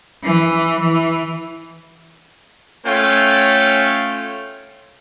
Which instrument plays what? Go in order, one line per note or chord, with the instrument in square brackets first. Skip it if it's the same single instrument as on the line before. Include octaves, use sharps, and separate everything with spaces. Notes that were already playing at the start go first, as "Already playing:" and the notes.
[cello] E3
E3
[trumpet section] A3 C#4 F4 C#5 F5 G5